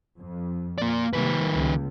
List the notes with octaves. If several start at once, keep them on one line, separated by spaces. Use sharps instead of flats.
F2
A#3 D5
C3 D#3 G3 A#3 B4
C#2